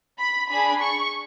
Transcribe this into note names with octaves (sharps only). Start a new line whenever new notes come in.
B5
D4 G#4 B5
C#6